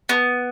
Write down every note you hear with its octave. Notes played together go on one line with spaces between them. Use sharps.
B3